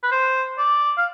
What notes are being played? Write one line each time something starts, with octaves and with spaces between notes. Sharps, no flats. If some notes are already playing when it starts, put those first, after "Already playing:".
B4
C5
D5
F5